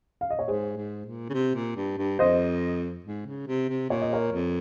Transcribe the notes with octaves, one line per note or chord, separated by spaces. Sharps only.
F5
D#5
A#2 C#5
G#2 G#4 C5
G#2
A#2
C#3
C3
A#2
G2
G2
F2 C5 D#5
G#2
C#3
C3
C3
A#2 C#5
D#5
A#4 C#5
F2